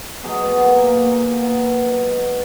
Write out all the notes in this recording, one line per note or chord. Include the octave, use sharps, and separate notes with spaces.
B2 F#3 G#4
B3
A#3
A#3
A#2 F#3
B3
G#2 D#3 F#3